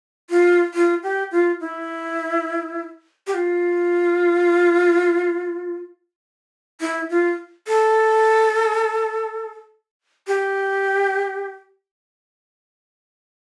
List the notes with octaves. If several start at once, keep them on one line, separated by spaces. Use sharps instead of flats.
F4
F4
G4
F4
E4
G4
F4
E4
F4
A4
G4